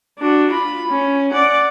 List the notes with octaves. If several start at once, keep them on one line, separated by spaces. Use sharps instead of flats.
D4 F#4
F4 B5
C#4
D5 F#5